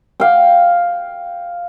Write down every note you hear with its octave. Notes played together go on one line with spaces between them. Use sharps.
F5 G5